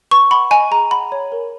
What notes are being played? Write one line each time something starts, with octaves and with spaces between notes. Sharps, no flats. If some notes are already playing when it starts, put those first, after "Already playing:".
B4 C#6
F#5 B5
D#5 G#5
G#4 A#5
F#5 B5
C#5
A#4